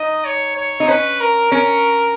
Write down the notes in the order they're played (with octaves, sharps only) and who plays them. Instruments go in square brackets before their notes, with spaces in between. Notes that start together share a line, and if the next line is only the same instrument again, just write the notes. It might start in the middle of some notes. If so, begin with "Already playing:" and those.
Already playing: [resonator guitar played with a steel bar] D#4 [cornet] D#5
[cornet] C#5
C#5
[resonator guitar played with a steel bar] D#4
[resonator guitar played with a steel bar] C#4 [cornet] B4
[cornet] A#4
[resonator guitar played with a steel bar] C#4 [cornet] A#4